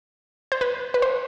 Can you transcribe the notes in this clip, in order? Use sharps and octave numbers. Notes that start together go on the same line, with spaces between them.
C5
B4
B4
C5